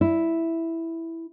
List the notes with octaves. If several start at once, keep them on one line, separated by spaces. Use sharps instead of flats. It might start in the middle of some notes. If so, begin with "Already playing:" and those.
E4